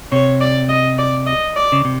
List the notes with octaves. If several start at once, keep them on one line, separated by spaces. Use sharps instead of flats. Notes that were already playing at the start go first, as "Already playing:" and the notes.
C3 C#5
D5
D#5
D5
D#5
D5
C#3
C3